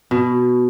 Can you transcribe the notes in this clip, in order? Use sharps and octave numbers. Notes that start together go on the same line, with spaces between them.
B2